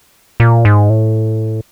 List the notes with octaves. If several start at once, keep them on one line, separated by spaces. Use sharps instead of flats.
A#2
G#2
A2